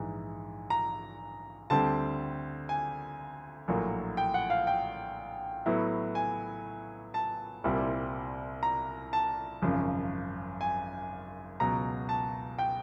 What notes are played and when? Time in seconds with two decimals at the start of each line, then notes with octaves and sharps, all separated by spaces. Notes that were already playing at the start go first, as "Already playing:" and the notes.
Already playing: A#1 G#2 E3
0.70 A#5
1.70 D2 D3 G3 C4 A5
2.69 G#5
3.68 A#1 A2 F#3 A#3
4.17 G5
4.34 F#5
4.50 F5
4.67 G5
5.66 A2 F#3 B3 E4
6.15 G#5
7.14 A5
7.64 C2 A#2 G3 C4 E4
8.63 A#5
9.13 A5
9.62 G#1 F#2 C#3 F3
10.61 G#5
11.60 C#2 B2 F#3 A#5
12.09 A5
12.59 G5